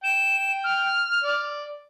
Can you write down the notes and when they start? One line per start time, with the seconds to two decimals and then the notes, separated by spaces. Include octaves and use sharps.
0.04 G5 E7
0.64 F6
1.24 D5